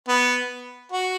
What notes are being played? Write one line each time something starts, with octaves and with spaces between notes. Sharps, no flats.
B3
F#4